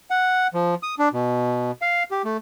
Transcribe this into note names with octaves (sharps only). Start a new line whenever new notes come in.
F#5
F3
D#6
D4
B2
F5
G4
A3